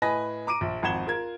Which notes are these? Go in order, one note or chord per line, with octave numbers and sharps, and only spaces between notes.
A2 B4 D#5 G#5 A#6
A#5 D6 D7 D#7
A#1
G#1 F2 F#5 G#6 E7 G7
F4 A#4 G#6